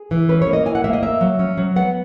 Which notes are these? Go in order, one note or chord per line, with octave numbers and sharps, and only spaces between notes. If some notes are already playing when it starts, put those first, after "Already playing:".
Already playing: G#4
E3
C#4 B4
C#5
A#3
D#5
E4 G#5
F#5
A#3 E5
D#5
A#3 E5
F#3
C#4
F#3
B3 F#5